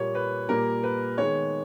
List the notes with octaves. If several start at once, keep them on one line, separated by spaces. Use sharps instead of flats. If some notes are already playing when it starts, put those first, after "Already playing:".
Already playing: A#2 G3 A#3 C#5
B4
A#2 G3 A#3 A#4
B4
D#3 G#3 B3 C#5